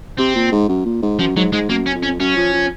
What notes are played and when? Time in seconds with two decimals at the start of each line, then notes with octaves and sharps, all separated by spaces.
0.18 C3 C4
0.35 A#2
0.52 G#2
0.69 F#2
0.85 A#2
1.02 G#2
1.19 F#2 F3
1.36 G#2 F#3
1.53 G#2 G#3
1.69 F#2 A#3
1.86 C#4
1.95 F2
2.03 C#4
2.20 F#2 C#4
2.37 F3
2.54 F3